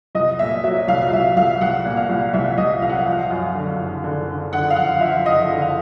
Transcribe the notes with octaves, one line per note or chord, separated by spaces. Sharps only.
C2 D#5
A#2 E5
F#3 E5
C2 F5
F5
C2 E5
C2 F5
C2 F#5
A#2
F5
C2
C2 E5
C2 D#5
C2 F5
F#5
F5
F3
F#2
D3
F#1
D3
D3
D3 F#5
F5
F3 F#5
F3 E5
F#1 D#5
D3
F5